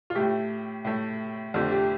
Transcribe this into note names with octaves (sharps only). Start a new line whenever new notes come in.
F4
A2 A3 G4
A2 A3
F2 D3 F3 A3 G4
G4